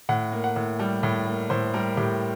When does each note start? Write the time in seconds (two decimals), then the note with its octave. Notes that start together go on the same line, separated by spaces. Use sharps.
0.09 A2 F#5
0.32 A#3
0.44 F#5
0.56 A2
0.80 G3
1.03 A2
1.26 A#3
1.50 A2 C5
1.74 G3 A#4
1.97 A2 G4